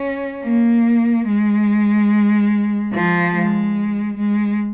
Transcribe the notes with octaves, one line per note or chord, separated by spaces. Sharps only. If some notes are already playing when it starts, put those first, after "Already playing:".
Already playing: C#4
A#3
G#3
F3
G#3
G#3